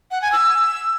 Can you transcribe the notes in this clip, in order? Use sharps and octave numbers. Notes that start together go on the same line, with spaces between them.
F#5
G#5
E6